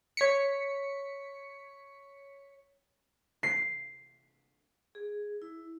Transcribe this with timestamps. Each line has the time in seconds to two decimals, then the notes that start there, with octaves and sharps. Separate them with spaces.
0.17 C#5 B6 C#7
3.43 C7
4.95 G#4
5.42 E4